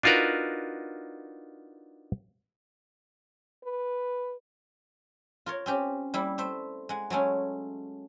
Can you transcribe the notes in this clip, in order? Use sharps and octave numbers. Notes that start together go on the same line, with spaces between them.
D4 D#4 F4 F#4 A#4 B4
B4
F4 A#4 C#5
C4 C#4 G4
G3 A#3 E4
A3 C5 E5
G#3 F#5
F#3 G#3 A3 C#4